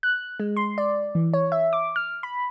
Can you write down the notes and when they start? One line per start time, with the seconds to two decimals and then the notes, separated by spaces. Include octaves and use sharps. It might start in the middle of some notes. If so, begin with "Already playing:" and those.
0.03 F#6
0.40 G#3
0.57 C6
0.78 D5
1.15 E3
1.34 C#5
1.52 E5
1.73 D6
1.96 F6
2.23 B5